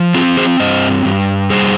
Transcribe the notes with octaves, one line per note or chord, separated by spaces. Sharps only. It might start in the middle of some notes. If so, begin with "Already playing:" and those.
Already playing: F3
C4 F4 G#4
G#4 C5
G2 C5 D#5
G2
G3 G#4 C5